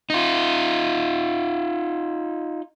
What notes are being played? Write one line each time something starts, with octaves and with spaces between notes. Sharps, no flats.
D#4 F4